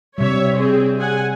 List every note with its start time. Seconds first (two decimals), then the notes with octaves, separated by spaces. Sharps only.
0.18 C3 G3 C#5 E5
0.56 C4 G#4
0.97 G#4 F#5 G#5